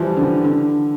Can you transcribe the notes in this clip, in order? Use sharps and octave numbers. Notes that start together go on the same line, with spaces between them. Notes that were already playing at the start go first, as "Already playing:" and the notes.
Already playing: E3 F3 G3
D3
D3